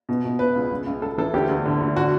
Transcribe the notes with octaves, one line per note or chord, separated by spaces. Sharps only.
B2
B2
B2 B4
C#2
C#2
C#2
C#2 A4
E3 A4
D2 G4
D2
D3
D2
D3 F#4